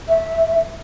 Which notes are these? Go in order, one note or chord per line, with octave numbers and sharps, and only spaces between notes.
E5